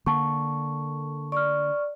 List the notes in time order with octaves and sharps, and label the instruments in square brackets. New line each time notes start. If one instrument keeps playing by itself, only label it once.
[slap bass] D3 A#3 [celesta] A5 C#6
[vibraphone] D5 [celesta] C#6 F6